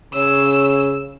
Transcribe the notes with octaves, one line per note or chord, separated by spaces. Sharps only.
C#3 C#5 E6